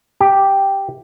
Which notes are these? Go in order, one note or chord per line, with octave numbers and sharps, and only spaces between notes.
G4